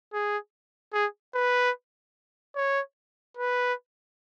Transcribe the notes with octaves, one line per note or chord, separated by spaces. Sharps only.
G#4
G#4
B4
C#5
B4